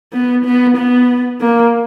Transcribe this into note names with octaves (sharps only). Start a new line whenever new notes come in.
B3
B3
B3
A#3